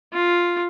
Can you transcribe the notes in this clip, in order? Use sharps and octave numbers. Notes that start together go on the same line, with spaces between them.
F4